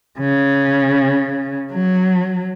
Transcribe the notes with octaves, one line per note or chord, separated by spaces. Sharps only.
C#3
F#3